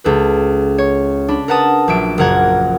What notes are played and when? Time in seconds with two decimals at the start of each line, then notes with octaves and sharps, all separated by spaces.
0.04 C#2 A4 B4
0.78 C#5
1.28 D4 B5
1.48 A#4 B4 F#5 A5 D#6
1.88 A#1 F#3 E5 D7
2.18 F#1 F3 A#4 F#5 A#5 G#6